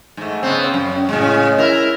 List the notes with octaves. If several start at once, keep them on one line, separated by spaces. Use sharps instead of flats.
G#2 A3
C#3 B3 C4
F#2
A2 C#3 G#3
E4 A#4